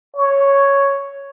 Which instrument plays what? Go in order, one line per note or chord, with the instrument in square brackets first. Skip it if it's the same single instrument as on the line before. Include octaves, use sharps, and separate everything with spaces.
[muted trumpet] C#5